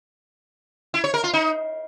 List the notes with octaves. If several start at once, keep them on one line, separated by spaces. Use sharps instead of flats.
E4
C#5
A#4
F4
D#4